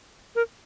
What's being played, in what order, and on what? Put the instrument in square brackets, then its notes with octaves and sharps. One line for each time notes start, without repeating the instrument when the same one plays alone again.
[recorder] A#4